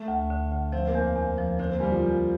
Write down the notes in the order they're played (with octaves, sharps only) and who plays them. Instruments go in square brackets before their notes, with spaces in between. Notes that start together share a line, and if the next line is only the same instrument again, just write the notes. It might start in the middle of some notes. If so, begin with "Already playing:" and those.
Already playing: [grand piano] A3
[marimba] D2
D3
D2
[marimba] F3 [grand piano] C4
[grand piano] A#3
[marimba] E2
E2
F3
[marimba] D3 [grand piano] C4
[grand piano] A#3
[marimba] E2 [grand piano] G3
[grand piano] F3
[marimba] E2